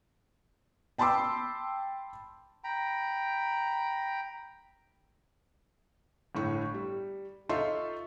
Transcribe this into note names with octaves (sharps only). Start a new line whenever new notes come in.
G5 A5 B5 C6 D6 E6
G5 A#5 B5
G1 A2 C#6
G3
D#4 F4 A4 E5 C6 C#6